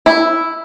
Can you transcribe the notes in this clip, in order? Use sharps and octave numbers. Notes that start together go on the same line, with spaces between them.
E4